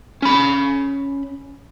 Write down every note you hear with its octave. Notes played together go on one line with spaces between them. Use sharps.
C#4 B5